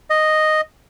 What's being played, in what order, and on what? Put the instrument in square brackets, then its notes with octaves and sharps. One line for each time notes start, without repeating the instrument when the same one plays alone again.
[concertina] D#5